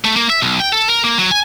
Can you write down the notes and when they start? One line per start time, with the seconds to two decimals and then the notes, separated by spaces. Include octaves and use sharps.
0.05 A3
0.16 A#3
0.30 E5
0.42 B1
0.60 G5
0.73 A4
0.89 A#4
1.04 A#3
1.19 F#3
1.31 G#5